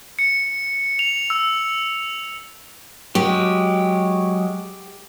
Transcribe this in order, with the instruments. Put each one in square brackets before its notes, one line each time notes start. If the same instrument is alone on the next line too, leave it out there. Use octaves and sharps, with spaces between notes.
[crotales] C#7
F7
E6
[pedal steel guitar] F#3 G#3 [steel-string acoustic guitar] G4